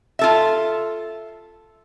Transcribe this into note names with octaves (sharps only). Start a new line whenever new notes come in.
F4 A4 E5